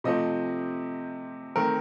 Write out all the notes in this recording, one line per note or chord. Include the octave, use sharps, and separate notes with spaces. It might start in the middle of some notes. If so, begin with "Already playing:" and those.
C3 F3 A3 C4 D#5
D#3 A3 C4 A#4